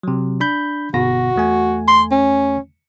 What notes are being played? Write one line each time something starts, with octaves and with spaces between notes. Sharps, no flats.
C3 F#3
D4 B5 G6
G1 B2 F#4 A#6
E2 A3 G#5
C6
C#4